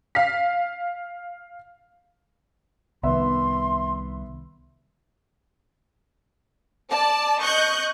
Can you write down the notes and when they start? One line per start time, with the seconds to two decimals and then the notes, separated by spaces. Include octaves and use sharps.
0.15 F5 B6
3.03 C2 D#3 B3 E5 C6
6.89 D5 A5
7.40 D#5 C#6 F#6 G6